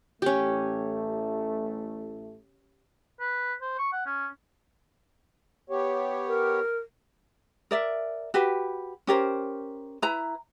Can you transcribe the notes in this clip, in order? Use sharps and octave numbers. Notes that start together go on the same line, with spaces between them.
A1 A3 C#4 G4
B4
C5
C#6
F#5
C#4
B3 G4 C#5
A#4
A#4 D5 E5
F#4 G4 B4
C#4 G4 A#4 C5
E4 B4 A#5